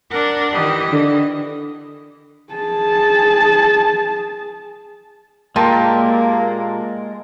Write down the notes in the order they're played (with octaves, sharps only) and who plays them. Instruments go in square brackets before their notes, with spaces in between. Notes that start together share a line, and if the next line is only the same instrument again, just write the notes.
[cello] D4 A#4 [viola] F#5
[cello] D#3 G4 [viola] E3 D#5
[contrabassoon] D3 [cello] D#3
[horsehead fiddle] G#4 A5
[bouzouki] A#2 G4 [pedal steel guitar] G#3 A#4 [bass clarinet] A#3 [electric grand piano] A5 C6